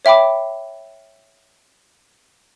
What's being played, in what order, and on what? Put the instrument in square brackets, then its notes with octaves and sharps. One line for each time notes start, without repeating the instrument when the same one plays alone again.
[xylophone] C#5 E5 G5 B5 D6